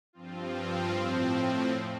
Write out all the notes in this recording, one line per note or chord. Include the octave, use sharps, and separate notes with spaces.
G2 F3 C4 F4
A2 F3 C4
F2